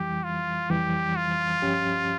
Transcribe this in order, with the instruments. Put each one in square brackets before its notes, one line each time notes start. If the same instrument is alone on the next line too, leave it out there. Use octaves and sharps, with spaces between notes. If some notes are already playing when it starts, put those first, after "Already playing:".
Already playing: [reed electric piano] F2 E3 G3 [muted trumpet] G4
[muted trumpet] F4
[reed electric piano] F2 E3 G3 [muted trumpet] G4
[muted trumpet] F4
[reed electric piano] G2 F3 C#4 G4